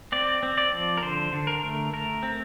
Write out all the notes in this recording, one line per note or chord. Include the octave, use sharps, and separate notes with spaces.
C4 D5
C4
D5
F3
A#4
D3 C5
D3
A#4
A3
A3 A#4
C4